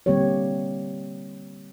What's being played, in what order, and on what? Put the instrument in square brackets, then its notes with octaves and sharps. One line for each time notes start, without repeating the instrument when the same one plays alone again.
[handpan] D3 G3 A#3 C4 G4 C#5